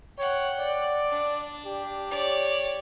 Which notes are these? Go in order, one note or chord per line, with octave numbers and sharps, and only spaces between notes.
C#5 F#5 G5
D5
D4
G4
C#5 D5